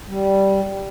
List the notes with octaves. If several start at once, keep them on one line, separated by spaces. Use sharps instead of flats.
G3